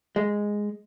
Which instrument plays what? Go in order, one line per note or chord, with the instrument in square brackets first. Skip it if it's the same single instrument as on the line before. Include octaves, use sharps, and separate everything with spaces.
[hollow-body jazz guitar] G#3